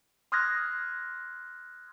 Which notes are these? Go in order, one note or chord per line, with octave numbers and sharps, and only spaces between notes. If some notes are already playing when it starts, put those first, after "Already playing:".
C6 D#6 F6 F#6 G#6 A#6